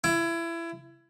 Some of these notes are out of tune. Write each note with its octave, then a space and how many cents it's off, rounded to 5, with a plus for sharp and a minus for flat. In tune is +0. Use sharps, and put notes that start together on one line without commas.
E4 +25